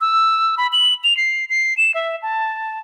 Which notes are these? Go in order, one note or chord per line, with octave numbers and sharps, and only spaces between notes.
E6
B5
F#7
F7
C7
C7
E7
E5
A5